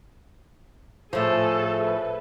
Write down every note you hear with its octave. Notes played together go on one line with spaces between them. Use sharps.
A2 F3 G#4 A4
B4